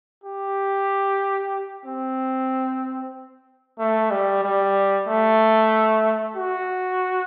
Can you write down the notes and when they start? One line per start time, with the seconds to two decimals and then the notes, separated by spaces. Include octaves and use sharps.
0.24 G4
1.85 C4
3.79 A3
4.11 G3
4.43 G3
5.07 A3
6.36 F#4